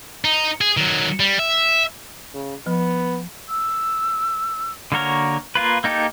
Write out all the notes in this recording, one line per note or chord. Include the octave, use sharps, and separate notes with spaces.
D#4
G#4
D#3 F#3
G3
E5
C#3
F3 B3
E6
D3 A#3 F#4 A#4 C#5
A#3 F4 B4
A#3 D#4 G4 A4